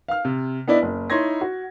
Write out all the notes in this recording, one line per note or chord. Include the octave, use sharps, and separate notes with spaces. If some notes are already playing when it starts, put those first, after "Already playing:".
F5 F6
C3
B3 D4 E4 D5 D#5
F#1
D#4 E4 C#5 C6 G#6 A#6
F#4